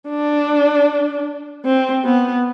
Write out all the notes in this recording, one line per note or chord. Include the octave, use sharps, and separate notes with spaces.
D4
C4
B3